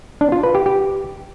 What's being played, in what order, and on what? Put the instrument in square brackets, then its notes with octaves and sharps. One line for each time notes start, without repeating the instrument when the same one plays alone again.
[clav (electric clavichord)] D4
F4
B4
G4
G4